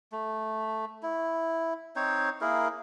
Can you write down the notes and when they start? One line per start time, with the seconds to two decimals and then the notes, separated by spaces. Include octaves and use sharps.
0.12 A3
1.03 E4
1.96 C4 D#4 C5 C#5
2.41 A#3 E4 G#4 A#4